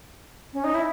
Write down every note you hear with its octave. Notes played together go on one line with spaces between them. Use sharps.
C#4
D#4
E4